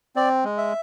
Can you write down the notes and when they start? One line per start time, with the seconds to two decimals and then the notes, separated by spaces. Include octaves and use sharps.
0.16 C4 D5
0.45 G#3
0.58 E5